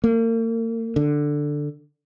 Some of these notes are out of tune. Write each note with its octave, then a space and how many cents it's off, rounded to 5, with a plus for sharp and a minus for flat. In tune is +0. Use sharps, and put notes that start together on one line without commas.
A#3 -40
D3 +5